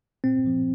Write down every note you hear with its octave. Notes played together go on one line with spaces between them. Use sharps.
A#2 C4
F3